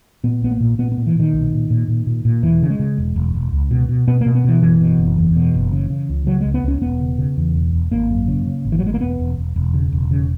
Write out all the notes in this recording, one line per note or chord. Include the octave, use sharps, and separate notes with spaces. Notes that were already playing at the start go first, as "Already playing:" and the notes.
A#2 B3
A#1 B3
A#3
A#2
A#2 B3
B3
A#2
E3
A#2 D#3
B1
A#2
A#2
A#2
A#2
A#2
E1 E3
C#3
G#3
C#3
E1
E1
E1
C#2
B2
B2
B2 B3
B2 A#3
B3
B2 E3
F#1 E3
B2
F#1
E2
B2
F#1
C#3
C#3
C#2
C#3 F#3
C#2 G#3
B3
C#2 C#4
E1 B3
C#3
C#3
E2
E1
E1
G#1 A#3
F#2
C#3
C#3
G#1
E3
F#3
G#1 G#3
A#3
E1 B3
E1
E1
E1
C#3
E1
C#3